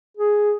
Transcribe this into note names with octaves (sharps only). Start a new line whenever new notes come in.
G#4